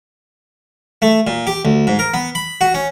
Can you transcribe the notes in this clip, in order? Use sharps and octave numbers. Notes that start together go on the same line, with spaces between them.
A3
A#2
G4
D2
G#2
A#4
B3
B5
F#4
C#4